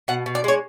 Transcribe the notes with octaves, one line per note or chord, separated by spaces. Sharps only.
B2 F#5
B2
D5
G#3 C#5